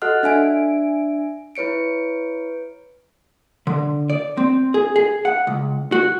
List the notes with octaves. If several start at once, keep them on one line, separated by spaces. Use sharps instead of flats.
F#4 A4 D#5 F#5 F6 F#6
D4 E5 G#5 D7
E4 B4 C#5 C#7 D7
D3
D5
C4
G#4
G#4
F#5
C#2
F#4